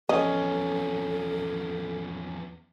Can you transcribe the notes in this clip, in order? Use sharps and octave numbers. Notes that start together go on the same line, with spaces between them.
E2 F3 B3 C#4 A4 D#5